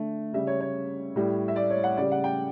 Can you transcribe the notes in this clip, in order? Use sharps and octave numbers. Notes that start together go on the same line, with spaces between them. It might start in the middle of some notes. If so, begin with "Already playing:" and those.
Already playing: D3 A3
C#3 G3 E5
C#5
C#5
A2 G3
E5
D5
C#5
F#5
C#3 G3 D5
F#5
G5